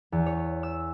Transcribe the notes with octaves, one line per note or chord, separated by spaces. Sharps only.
E2
C#5
E6